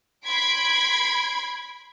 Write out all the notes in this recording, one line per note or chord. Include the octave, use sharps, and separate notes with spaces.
B5 C6 G#6 B6 D7